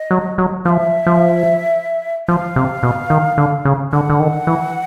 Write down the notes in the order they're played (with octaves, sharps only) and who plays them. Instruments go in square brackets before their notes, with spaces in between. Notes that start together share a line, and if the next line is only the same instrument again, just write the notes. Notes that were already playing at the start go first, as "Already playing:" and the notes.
Already playing: [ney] D#5
[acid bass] F#3
F#3
[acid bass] F3 [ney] E5 F5
[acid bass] F3
[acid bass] F3 [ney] F5
[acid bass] C3
B2
D#3
D3
C#3
[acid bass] D3 [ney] F#5
[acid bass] D3
D#3
E3